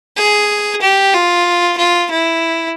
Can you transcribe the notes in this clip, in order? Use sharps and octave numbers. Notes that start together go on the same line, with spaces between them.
G#4
G4
F4
F4
E4